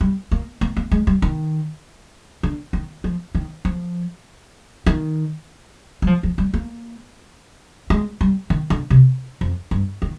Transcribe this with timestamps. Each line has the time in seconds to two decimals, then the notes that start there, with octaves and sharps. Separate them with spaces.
0.01 G3
0.31 A#3
0.61 A#3
0.77 A#3
0.91 G#3
1.07 G3
1.22 D#3
2.43 D3
2.73 D#3
3.04 F3
3.35 D#3
3.65 F3
4.86 D#3
6.02 G3
6.07 F3
6.23 F3
6.38 G3
6.54 A#3
7.90 G#3
8.21 G3
8.50 D#3
8.70 D3
8.90 C3
9.41 F2
9.71 G2
10.02 D#3